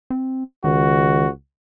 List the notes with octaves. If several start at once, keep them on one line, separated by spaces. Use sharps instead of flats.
C4
C#2 D#3 F#4